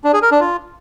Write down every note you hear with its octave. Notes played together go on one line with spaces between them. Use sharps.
D4
G#4
A#4
D4
F4